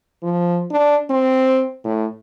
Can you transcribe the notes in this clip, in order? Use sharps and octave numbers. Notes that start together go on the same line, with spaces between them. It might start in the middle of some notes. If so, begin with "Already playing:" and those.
F3
D4
C4
A2